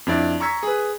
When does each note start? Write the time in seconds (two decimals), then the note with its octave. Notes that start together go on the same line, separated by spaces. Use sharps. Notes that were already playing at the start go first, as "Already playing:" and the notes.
0.07 F2 D4 E4 D5
0.40 A#5 C#6 E6 G#6 B6
0.63 G#4 B4